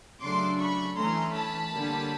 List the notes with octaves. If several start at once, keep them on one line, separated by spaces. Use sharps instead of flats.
C#3 F#3 A3 D4 C6 D6
B5 C#6
E3 A3 C#4 A#5 C6
A5 B5
D3 G3 A#3 C#4